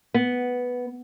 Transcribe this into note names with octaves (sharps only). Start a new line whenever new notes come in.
B3